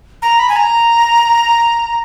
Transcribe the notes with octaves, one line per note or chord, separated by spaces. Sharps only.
A#5
B5
G#5
A#5